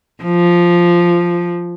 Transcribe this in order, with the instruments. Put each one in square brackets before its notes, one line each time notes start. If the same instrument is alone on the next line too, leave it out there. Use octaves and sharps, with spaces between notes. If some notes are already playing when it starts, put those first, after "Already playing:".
[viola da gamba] F3